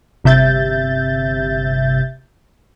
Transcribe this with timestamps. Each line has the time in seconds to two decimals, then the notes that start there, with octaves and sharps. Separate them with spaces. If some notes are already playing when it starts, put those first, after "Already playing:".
0.24 G1 C3 E5 G6 A6